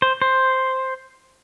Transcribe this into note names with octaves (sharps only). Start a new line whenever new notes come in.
C5
C5